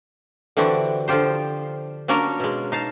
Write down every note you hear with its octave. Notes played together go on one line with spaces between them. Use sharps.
D3 E3 C4 D4 F#4 G4
D3 F3 F4 G4 C5
F#3 A#3 C#4 D4 A#4 C#5
B2 G#3
D#4 F5 A5